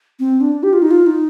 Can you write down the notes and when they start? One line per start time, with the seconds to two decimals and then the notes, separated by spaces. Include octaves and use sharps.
0.19 C4
0.41 D4
0.63 G4
0.73 F4
0.82 D#4
0.91 F4
1.06 D#4